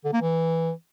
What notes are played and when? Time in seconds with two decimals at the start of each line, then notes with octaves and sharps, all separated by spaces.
0.04 D3
0.13 A#3
0.22 E3